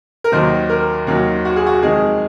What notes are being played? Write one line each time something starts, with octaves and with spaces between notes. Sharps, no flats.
A#4
D#2 D#3 F#3 C5
A#4
D#2 D#3 F#3
F#4
G#4
F#4
F2 D#3 G#3 G#4